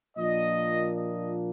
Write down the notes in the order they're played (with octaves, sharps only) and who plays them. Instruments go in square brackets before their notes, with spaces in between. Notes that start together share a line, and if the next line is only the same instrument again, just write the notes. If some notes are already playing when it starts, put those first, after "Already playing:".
[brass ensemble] A#2 F3 A#3 D4 D#5
D#5